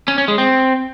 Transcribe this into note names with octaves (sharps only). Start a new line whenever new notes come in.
C#4
C#4
G#3
C4